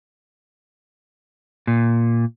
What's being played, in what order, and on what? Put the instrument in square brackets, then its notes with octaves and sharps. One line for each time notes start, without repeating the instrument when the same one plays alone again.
[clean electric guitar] A#2